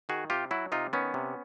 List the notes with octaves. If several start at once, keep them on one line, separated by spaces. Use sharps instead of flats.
D#3 F#4 G#4
C3 F4 G4
F#3 E4 F#4
C3 D#4 F4
D#3 B3 C#4
C3